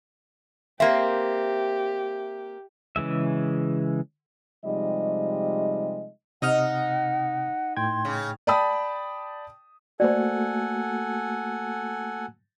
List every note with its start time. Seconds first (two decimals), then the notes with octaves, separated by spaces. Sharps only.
0.80 A#3 C4 G4 E5
2.96 C#3 E3 G#3 E5
4.65 C3 F3 G3 G#3 D#4 D#5
6.42 C3 D#4 F#5 D#6 F6
7.77 A2 G5 C6 G#6
8.05 C#3
8.47 D5 G5 A5 B5 D#6
10.00 A3 A#3 F#4 A4 C5 D5 F#5 G#5